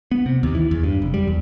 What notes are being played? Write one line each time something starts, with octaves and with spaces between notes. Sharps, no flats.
B3
C3
D#2
E3
E2
G2
F1
G3
E2